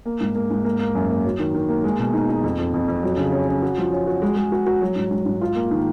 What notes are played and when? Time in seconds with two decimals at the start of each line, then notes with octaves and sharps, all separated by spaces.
0.06 A#3
0.20 G#2
0.35 A#3
0.50 G#2
0.65 A#3
0.79 A#3
0.95 F#2
1.10 A#3
1.25 F#3
1.39 D#3
1.54 D#3
1.69 A#3
1.84 G#3
1.99 B2
2.14 D#4
2.29 D#4
2.44 F2
2.59 F2
2.74 F2
2.88 F2
3.03 F#3
3.17 C#3
3.32 C#4
3.48 C#4
3.62 F#4
3.78 F3
3.92 C#4
4.07 F#4
4.22 G#3
4.36 G#3
4.52 F#4
4.66 F#4
4.81 F#3
4.96 G#2
5.11 G#2
5.25 G#2
5.41 F4
5.55 A#3
5.71 D#3